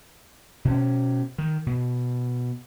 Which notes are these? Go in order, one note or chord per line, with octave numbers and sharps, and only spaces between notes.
B2 C#4
D#3
B2